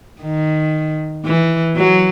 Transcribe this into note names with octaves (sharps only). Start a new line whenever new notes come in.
D#3
E3
F#3